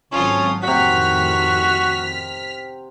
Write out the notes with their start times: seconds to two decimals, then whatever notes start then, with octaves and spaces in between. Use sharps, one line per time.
0.13 G#1 F#3 C4 C#4 F4 A4 D#6
0.63 F2 A2 C3 D#3 F#4 F#5 F6 B6